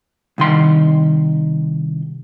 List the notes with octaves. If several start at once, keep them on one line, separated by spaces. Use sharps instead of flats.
C2 D#3 C6